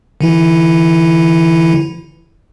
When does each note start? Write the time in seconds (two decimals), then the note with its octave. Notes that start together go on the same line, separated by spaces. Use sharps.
0.21 D3 E3 E4